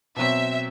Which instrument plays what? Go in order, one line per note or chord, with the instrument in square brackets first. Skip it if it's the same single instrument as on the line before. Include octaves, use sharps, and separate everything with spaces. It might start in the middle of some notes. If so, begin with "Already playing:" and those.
[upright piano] B2 F#3 C4 [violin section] E5